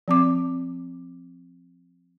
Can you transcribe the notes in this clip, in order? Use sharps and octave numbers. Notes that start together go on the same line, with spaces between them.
F3 C4 D6